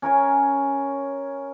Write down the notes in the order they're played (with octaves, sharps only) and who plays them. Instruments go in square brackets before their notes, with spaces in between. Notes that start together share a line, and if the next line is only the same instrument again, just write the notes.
[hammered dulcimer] C#4 A#4 C#5 G#5